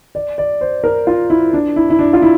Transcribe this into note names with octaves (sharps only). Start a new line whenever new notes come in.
D5
D5
C5
A#4
F4
E4
D4
E4
E4
D4
F4
E4